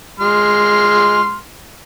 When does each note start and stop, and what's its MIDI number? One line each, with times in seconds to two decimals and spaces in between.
0.20 1.36 56
0.20 1.36 84
0.20 1.36 89